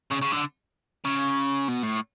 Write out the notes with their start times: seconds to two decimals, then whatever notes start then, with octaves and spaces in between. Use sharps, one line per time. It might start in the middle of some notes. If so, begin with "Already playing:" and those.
0.11 C#3
0.22 C#3
0.33 D3
1.05 C#3
1.68 B2
1.83 A2